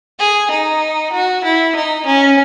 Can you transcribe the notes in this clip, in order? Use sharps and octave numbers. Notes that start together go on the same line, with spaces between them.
G#4
D#4
F#4
E4
D#4
C#4